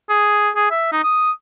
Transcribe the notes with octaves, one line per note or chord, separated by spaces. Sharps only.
G#4
G#4
E5
D#4
D#6